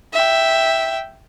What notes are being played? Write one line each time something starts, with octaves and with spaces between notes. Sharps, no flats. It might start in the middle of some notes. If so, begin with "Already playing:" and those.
E5 G5